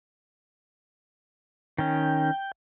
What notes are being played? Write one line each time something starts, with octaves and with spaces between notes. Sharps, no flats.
D#3 C#4 G5